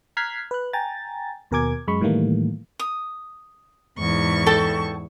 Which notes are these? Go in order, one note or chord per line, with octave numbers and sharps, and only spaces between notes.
A#5 F6 F#6 G#6 B6 C7
B4 F#6
G5 G#5 A#5 A6
D#2 B2 A#4 G#5 D6 G#6
F#2 G#3 B5 C#6
A2 D#3 E3 G3 A3 A#3
D#6
E2 G#2 C#6
A4 G5 A5